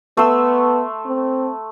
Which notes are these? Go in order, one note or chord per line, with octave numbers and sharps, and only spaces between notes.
A3 B3 C6 E6
C4